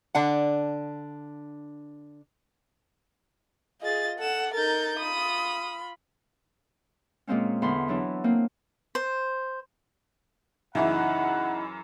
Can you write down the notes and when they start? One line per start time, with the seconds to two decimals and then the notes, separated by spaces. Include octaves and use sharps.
0.15 D3 D4 F#5
3.82 F4 G#4 D#5 A6
4.19 A4 F#5 E7
4.54 D#4 A#4 G6 A6
4.99 F4 B5 D#6
7.27 A#2 G#3 A#3 C4 C#4
7.62 E2 D3 B5 C6
7.88 E3 F#3 D4 E4
8.24 A#3 C4
8.95 C5
10.75 F#2 C#3 E3 D#4 E4 F#4 F#5 B5